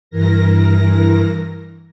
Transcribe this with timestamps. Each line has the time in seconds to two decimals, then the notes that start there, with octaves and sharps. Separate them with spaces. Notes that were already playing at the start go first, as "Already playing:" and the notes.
0.10 G2 E3 A#4 A#6